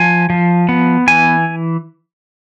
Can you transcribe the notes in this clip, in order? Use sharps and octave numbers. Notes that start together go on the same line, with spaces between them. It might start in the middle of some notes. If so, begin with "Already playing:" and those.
Already playing: F3 G#5
F3
B3
E3 G#5